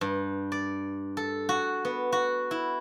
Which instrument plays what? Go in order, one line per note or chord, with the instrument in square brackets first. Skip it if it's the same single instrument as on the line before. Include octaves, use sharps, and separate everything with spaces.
[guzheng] G2
D5
A4
F#4
B3
F#4
E4